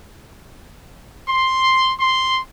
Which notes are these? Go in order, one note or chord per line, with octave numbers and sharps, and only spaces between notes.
C6
C6